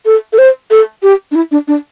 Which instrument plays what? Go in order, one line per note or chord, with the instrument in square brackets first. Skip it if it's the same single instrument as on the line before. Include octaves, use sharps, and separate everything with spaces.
[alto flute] A4
A4
C5
A4
G4
D4
E4
D4
D4